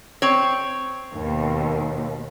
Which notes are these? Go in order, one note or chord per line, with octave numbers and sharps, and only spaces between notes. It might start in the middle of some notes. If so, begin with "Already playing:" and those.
C4 C#5
D#2 B2